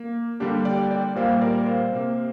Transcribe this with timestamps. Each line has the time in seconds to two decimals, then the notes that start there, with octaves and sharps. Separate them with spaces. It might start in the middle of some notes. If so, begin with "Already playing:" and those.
Already playing: A#3
0.40 D3 G3 A#3 D4 G4
0.65 D5 G5
0.91 D5 G5
1.15 A#2 G3 A#3 C5 F5
1.41 A#4 D5
1.66 C5 F5
1.92 C3 A#3